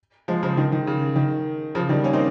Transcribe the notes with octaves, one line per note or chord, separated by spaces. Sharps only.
F3 G#3
C#3 F3
D#3
D#3
C#3
D#3
C#3 F3
D#3 G3
A#3 C#4
C4 D#4